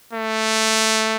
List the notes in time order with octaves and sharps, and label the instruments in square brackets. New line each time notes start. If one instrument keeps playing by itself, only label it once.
[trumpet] A3